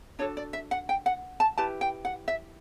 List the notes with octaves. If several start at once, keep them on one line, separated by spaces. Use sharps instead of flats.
D4 F#4 A4 C#5
D5
E5
F#5
G5
F#5
A5
E4 G4 B4 A5
G5
F#5
E5